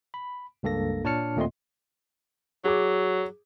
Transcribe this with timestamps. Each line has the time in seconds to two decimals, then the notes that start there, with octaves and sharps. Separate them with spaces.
0.14 B5
0.63 C#2 G2 A#3 A4 A#6
1.04 A#2 D4 C#5 A5 F6 C#7
1.37 D#2 A#2 A3 C4 D#5 C6
2.64 F#3 G#4 D6